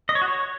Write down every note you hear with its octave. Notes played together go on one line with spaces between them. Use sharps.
D#5
C#5
F#4
C#5